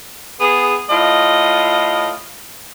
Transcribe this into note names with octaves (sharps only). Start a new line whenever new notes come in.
B3 G#4
A2 F4 D#5